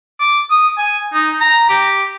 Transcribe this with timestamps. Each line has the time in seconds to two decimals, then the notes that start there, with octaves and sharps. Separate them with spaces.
0.20 D6
0.51 D#6
0.78 G#5
1.14 D#4
1.41 A#5
1.70 G4